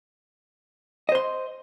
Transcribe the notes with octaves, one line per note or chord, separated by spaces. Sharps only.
C5 D#5 C6